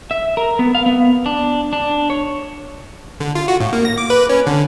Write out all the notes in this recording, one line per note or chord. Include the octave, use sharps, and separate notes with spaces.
E5
A#4
B3
F5
B3
D4
D4
C#5
D3
F4
F#4
A2
A#3
A#6
D6
B4
C#4
D3